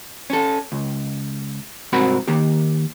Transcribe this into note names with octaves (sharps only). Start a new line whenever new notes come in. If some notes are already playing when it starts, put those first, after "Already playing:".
C#4 A4
C#2
C2 G#2 C4 F#4 A#4 B5
D#3 A#3 G4